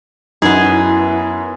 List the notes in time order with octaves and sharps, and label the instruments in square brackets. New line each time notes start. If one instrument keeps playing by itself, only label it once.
[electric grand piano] F#2 B4 [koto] B3 G#4 [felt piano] D#4 [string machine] E4